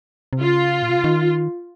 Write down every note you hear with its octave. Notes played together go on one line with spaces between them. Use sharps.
C3
C#3 F4
A#2
C3
C#3
D#3